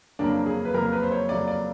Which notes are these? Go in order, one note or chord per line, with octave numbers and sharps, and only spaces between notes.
F2 C#3 F#3 A#3 D4
G#4
B4
F2 C#3 F#3 A#3 A#4
B4
C5
C#5
F2 C#3 F#3 A#3 D5
D5